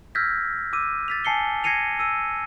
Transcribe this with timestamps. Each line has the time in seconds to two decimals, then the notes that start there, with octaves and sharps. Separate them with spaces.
0.15 E6 F6 G6 G#6 A#6 B6
0.73 D6 E6 D#7
1.08 A6 B6 F7
1.25 G#5 A5 C7 C#7 G7
1.64 G#6 A#6 C7 C#7 D#7 F7
1.99 E6 D#7